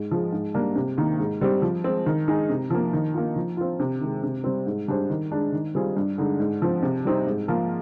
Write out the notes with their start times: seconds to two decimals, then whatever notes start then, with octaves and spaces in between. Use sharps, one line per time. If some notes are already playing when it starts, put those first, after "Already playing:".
Already playing: G#2
0.11 F3 G#3
0.32 G#2
0.54 G3 A#3 D4
0.75 C3
0.98 D#3 A#3
1.19 G#2
1.41 G3 C4 G4
1.62 F3
1.84 G#3 C4
2.06 D#3
2.28 G#3 D#4 G#4
2.49 C3
2.70 F3 A#3
2.93 D#3
3.14 A#3 F4
3.36 F3
3.57 C4 F4
3.79 C3
4.01 D#3 G#3
4.23 C3
4.44 G3 C4
4.66 G#2
4.88 G3 D4 G#4 C5
5.10 D#3
5.31 G#3 D4
5.52 D#3
5.75 G3 C4 F4 G#4
5.97 G2
6.18 D3 G#3 D#4
6.40 G#2
6.62 F3 C4
6.82 C3
7.05 G3 C4 D#4
7.27 G#2
7.48 F3 A#3 F4